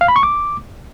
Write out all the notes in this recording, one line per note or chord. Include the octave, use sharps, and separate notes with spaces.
F5
B5
C#6
D6